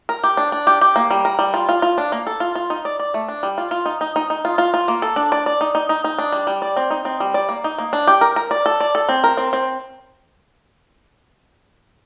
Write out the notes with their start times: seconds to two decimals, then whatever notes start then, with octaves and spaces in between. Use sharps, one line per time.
0.09 A#4
0.24 G4
0.37 D4
0.52 D4
0.67 G4
0.81 G4
0.96 A#3
1.11 G3
1.25 A#4
1.39 G3
1.54 F4
1.69 F4
1.82 F4
1.98 D4
2.12 A#3
2.27 A4
2.40 F4
2.55 F4
2.70 D#4
2.85 D5
2.99 D5
3.14 A3
3.28 D4
3.43 G3
3.58 F4
3.71 F4
3.86 D#4
4.01 D#4
4.16 D#4
4.30 D#4
4.45 F4
4.58 F4
4.74 F4
4.88 A#3
5.02 A4
5.16 D4
5.32 D5
5.46 D5
5.61 D#4
5.75 D#4
5.89 D#4
6.04 D#4
6.19 D4
6.32 G3
6.47 G3
6.62 D5
6.76 C4
6.91 D#4
7.05 C4
7.20 G3
7.34 D5
7.49 A#3
7.64 D#4
7.78 A#3
7.93 D4
8.07 G4
8.21 A#4
8.36 A#4
8.51 D5
8.66 A4
8.80 D5
8.95 A4
9.09 C4
9.24 A#4
9.37 C4
9.53 C4